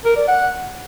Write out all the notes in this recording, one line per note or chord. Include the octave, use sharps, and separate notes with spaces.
A#4
D5
F#5